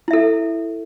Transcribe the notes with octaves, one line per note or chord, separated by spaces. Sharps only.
E4 A4 E5